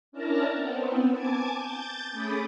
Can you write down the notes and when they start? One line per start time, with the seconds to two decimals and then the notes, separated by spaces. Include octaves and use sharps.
0.12 C#4 D4 E4 A#4 A5 A#5
0.52 B3 C4
1.11 G#5 A5 D6 G#6
1.55 G6 A6
2.12 A3 C#4 G#4 B5 D6 D#6